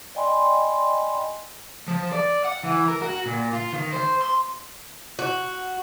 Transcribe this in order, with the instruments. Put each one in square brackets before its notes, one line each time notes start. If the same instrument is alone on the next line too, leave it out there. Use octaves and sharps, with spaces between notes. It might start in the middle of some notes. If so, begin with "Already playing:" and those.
[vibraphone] D5 D#5 G5 G#5 B5 C6
[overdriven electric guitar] F3
D5
F#5
E3
A#4
F#4
A#2
F4
D#3
C5
C6
[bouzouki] F#4